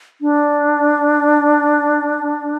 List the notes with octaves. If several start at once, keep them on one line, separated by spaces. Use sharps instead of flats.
D4